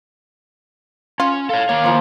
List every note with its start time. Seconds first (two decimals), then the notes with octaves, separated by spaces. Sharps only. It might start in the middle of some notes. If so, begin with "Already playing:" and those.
1.20 C#4 F4
1.49 A4 C#5 F5
1.69 D#3 A#3 C#5
1.84 F3 A#3 E4